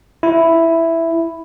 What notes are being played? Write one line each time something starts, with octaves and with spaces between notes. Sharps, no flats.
E4